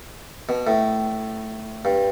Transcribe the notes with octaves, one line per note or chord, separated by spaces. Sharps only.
B2
A2
G2